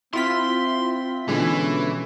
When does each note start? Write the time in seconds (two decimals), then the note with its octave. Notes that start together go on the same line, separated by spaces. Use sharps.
0.14 C4 E4 F4 C6 B6
1.29 B2 D3 E3 G#3 C#4